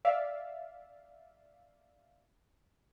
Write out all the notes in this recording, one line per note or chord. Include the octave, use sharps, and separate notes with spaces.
D5 E5 F5